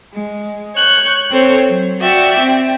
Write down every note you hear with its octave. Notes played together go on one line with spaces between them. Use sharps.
G#3
C#5 F#6 G6
C4 A4 C5 C#5
F#3
F#4 D5 E5 G5
C4